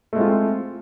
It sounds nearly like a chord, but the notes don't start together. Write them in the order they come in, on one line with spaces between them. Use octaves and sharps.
A3 G#3 C4 F4 E4